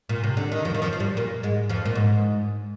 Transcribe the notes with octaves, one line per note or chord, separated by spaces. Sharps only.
A#2
C3
D3
D#3
F2 F3
D#3
F2 F3
F3
G2 G3
A#2 A#3
G#2 G#3
F2 F3
A#2
G#2